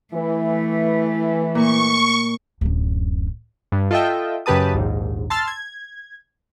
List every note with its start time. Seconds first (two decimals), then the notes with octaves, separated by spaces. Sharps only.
0.14 E3 A3
1.55 A#2 C#6
2.61 D1 F#2
3.72 G2
3.91 F4 A4 D#5 E5 G5
4.46 F#2 C#3 G4 B4 A5 D#6
4.74 A#1 D#2 G#2
5.30 A5 C6 E6 F6 A6
5.48 G#6